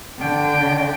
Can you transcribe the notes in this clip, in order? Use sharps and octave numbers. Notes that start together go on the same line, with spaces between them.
D3 G5